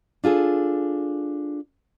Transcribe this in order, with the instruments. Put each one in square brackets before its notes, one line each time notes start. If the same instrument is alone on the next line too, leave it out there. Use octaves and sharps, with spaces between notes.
[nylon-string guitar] D4 F4 G#4 A4